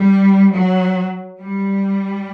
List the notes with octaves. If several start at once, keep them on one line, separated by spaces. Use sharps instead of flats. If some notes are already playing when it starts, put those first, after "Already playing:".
Already playing: G3
F#3
G3